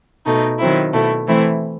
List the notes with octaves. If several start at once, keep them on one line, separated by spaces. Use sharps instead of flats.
B2 A3 D#4
D#3 F#3 C4 E4
B2 A3 E4
E3 A3 C4 E4